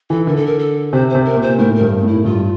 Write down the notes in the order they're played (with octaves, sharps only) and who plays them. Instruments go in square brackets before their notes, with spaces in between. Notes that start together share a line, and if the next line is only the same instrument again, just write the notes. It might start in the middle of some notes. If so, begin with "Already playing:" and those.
[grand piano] E3 [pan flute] A4
[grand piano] D3 [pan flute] A#4
[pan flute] A4
A#4
A4
[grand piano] C3 [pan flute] C5
[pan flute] C5
[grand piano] C3
[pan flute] A#4
[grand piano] A#2
[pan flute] C5
[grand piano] A2 [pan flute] A#4
[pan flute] A#4
[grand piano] G2
A2
[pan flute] E4
[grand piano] G2 [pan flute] F4